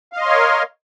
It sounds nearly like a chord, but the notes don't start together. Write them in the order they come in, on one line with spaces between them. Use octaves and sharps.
F5 D#5 C6 C#5 A#4